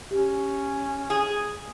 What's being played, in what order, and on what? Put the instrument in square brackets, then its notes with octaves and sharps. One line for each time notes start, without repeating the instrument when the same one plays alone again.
[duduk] C#4 [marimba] G4
[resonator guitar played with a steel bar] G#4